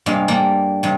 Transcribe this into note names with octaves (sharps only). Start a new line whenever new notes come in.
G2 C3 G#3 A#3 F5
G3 A#3 D4 A4 A#5
G2 C3